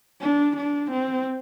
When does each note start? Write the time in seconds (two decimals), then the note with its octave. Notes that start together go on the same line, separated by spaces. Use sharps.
0.22 D4
0.57 D4
0.91 C4